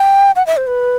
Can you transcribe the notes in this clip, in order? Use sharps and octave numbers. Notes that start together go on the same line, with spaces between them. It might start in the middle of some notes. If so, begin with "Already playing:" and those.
Already playing: G5
F#5
E5
C5
B4